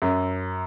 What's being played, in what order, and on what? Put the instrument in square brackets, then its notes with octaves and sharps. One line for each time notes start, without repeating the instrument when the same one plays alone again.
[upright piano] F#2